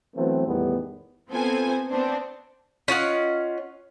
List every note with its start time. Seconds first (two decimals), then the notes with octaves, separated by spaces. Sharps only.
0.16 E3 F#3 A3 B3 C4
0.47 E2 A2 D#3 G3 B3
1.30 B3 C4 F4 A4 C5 G#5
1.89 B3 C4 D4 C5
2.88 C#4 F4 D#5 F#5